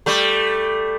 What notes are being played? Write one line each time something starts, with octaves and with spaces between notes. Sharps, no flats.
G3 A3